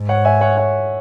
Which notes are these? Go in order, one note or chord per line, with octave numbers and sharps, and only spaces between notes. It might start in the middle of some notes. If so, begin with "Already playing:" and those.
Already playing: G#2
C#5 F#5
E5 G#5
C#5 F#5
C#5 F#5